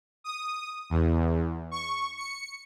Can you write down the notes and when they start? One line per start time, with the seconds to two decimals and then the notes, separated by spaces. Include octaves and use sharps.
0.24 D#6
0.90 E2
1.71 C#6
2.17 C#7